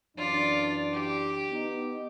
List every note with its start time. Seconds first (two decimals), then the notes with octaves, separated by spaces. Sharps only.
0.17 F#2 E3 D4 F4 D5
0.93 G4
1.51 B3 D#4